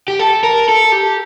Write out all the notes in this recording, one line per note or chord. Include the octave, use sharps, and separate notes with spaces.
G4
A4
A#4
A4
G4